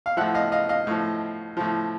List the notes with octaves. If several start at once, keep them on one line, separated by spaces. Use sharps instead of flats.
F5
A2 F3 E5 F#5
D#5 F5
D#5 F5
D#5 F5
A2 F3
A2 F3